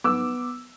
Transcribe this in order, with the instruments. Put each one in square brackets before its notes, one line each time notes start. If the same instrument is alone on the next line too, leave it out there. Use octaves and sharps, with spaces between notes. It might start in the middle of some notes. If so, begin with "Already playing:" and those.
[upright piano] B3 D6 E6